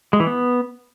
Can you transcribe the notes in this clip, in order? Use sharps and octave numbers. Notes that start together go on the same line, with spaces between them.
G#3
E3
B3